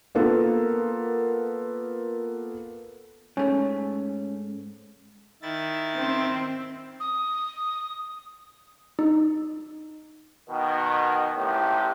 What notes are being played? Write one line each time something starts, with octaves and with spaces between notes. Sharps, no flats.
A#3 B3 F4 A4 A#4
G#2 A3 C#4
D#3 E4 A6
C4
D#6
D#4
B2 D#3
A1 A2 C3 G4